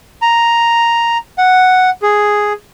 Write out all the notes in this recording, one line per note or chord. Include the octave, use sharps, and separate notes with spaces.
A#5
F#5
G#4